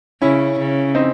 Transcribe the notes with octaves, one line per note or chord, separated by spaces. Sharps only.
C#3 C#4 E4
C#3
C4 D#4